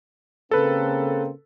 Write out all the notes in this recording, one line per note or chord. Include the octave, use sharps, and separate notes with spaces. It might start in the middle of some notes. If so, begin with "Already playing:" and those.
C#3 A#3 C4 A4 B4